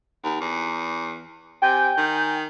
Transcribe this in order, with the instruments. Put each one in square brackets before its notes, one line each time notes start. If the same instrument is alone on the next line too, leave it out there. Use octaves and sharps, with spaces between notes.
[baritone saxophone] D#2
E2
[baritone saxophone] C3 [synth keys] G5 G#5 G6
[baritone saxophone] D#3